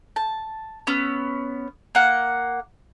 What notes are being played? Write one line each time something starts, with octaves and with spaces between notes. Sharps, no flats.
A5
B3 C#4 E6
A#3 F#5